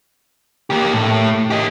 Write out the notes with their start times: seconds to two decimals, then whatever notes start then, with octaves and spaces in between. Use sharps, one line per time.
0.70 A#3 G4
0.93 A2
1.50 G4 D#5